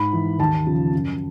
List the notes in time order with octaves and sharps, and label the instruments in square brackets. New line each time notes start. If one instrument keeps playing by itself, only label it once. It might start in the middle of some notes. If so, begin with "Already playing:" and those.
Already playing: [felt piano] G#2 B5
E3
D#2 A5
C#3 F3
F#2